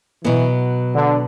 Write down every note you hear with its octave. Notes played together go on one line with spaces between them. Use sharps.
B2 E3 F#3 B3
D3